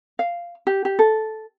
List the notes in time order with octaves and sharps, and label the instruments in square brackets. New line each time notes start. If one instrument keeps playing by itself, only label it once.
[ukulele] F5
G4
G4
A4